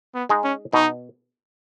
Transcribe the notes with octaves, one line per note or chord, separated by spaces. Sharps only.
B3
G#3 D#4 G#4 D#5
C#4
B2 D#4